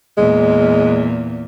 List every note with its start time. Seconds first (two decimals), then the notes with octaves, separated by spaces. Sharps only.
0.18 E2 A#2 G#3